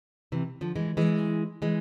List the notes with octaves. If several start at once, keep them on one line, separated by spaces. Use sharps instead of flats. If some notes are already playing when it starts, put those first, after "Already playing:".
C3 E3
D3 F3
E3 G#3
E3 G#3
E3 G#3